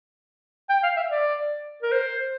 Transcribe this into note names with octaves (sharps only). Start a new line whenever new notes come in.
G5
F5
E5
D5
A#4
C5